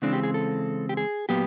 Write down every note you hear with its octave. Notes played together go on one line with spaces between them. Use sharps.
C#3 E3 G#3 C4 D4
G4
G#4
A4
G4
G#4
A#2 F#3 B3 G4